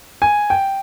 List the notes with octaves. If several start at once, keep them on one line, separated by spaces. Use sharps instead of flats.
G#5
G5